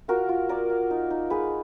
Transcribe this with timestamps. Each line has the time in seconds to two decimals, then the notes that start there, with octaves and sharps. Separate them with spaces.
0.08 F4 F#4 A#4
0.29 F4
0.49 A#3 A#4 D5
0.70 A#3
0.90 D#4
1.10 D#4
1.30 G#3 G#4 B4